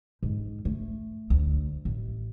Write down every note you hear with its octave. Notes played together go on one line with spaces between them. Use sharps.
G#2
A3
D2
A1